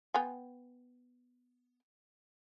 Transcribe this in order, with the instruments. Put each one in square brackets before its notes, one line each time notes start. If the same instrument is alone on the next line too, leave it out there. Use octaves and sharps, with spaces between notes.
[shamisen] B3 G5 G#5